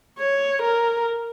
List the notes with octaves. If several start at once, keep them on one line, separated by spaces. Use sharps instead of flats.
C#5
A#4